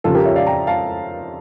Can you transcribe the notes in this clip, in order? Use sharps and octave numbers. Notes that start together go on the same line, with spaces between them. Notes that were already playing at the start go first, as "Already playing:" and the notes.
F2 C#3 G3 F4 A4
G4 A#4
C#5 E5
D5 F5
G5 A#5
F5 A5